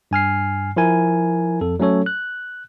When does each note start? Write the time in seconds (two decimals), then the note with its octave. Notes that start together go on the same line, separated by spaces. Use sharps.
0.11 G2 G#5 F6 C7
0.76 F3 E4 A#4 G#5
1.61 F2 A4
1.80 F#3 A3 C#4 A4 C#5
2.06 F#6